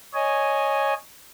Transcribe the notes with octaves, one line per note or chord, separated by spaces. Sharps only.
C#5 D#5 G#5